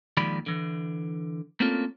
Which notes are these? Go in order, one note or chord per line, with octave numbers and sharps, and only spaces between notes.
D#2 D#3 F3 G#3 D5 B5
D3 E3
A3 A#3 C4 C#4 F4 A4